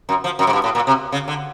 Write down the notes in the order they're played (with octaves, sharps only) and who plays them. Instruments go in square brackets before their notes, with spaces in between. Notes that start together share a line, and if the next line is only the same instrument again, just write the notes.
[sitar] F#2
F3
F#2
G#2
G2
A2
A#2
C3
C#3
D3